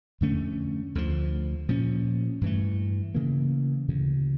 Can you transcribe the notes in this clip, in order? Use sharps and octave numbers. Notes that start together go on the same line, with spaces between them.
F2 D3 A3 C#4
D2 D3 F3
A#2 F3 C#4
G2 E3 A3
C#3 E3 A#3
D2 C#3 E3